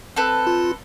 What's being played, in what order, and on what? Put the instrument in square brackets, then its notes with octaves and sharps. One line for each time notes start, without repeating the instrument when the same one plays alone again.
[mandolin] C4 A4 B4
[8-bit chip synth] F4